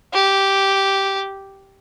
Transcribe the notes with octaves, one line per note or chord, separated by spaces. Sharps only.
G4